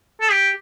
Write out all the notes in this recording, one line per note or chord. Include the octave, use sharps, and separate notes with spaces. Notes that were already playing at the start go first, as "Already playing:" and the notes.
A4
G4